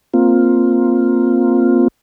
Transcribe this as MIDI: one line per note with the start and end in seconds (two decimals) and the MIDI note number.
0.14 1.88 58
0.14 1.88 60
0.14 1.88 65